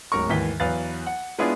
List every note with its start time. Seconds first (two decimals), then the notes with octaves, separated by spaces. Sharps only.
0.12 D1 G#2 A#4 C#6
0.29 D#2 G#2 D#3 E3 B6 G7
0.60 E2 F#3 B4 F5 F#6 A6
1.06 F#5
1.39 G#3 B3 D4 E4 F4 G#4